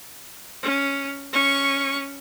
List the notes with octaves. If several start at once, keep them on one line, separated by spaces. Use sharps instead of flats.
C#4
C#4 C#6